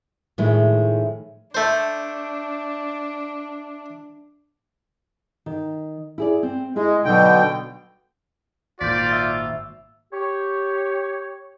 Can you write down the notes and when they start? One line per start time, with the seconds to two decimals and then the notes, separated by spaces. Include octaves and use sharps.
0.38 A2 D#3 F3 G#3 A3
1.55 A3 D4 C5
5.46 D#3
6.18 E4 G#4 D5
6.43 C4
6.76 G#3 E4 G#4 D#5
7.05 B2 D3 F#3 D#4 G5
8.81 G#1 A#2 F4 A4 D5 G6 B6
9.13 E5 E6
10.13 G4 C#5